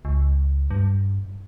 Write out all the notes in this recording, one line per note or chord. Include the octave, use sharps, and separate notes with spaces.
C#2
G2